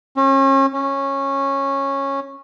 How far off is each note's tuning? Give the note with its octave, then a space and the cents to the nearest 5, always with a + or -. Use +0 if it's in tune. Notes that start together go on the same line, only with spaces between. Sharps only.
C#4 -35
C#4 -15